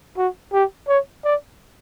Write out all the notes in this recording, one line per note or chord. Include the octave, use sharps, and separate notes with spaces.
F#4
G4
C#5
D5